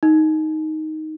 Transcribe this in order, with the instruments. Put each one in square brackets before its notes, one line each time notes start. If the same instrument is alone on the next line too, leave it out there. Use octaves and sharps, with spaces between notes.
[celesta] D#4